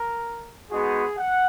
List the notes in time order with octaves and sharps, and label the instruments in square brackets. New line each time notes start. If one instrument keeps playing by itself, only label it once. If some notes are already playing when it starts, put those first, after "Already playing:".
Already playing: [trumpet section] A#4
G#3 B3 D#4 F#4 G#4
F#5